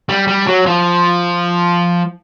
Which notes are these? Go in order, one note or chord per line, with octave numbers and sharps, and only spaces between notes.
G3
G3
F#3
F3